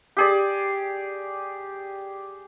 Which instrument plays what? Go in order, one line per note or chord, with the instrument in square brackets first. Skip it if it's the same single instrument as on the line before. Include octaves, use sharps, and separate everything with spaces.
[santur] G4 G#4 D5